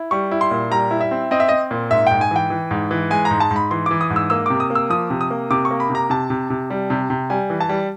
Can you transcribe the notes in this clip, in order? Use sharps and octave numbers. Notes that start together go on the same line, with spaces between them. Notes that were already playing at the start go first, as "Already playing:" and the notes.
Already playing: E4
G3 C#6
E4
C6
A#2
G3 A#5
E4
E5
C4
C4 D#5
E5
C4 D#5
A#2
G#2 E5
G#2 G5
G#5
E3 G5
E3
G#2
E3
G#3 G#5
A#5
G#2
A5
G#2
B5
E3 C6
E3 D6
D#6
G#2
E6
A#3 E6
C3 D6
D#6
A#3
E6
F3 D#6
C3
D#6
A#3
C3 D6
C#6
A#3
B5
C3
A#5
C3 A5
C3
C3
G3
C3
C3
G3 G#5
E3
A5
G3